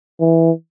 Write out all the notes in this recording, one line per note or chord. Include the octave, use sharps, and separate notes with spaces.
E3